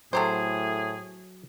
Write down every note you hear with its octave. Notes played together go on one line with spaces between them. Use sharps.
A2 F#3 A3 G4 G#4 C5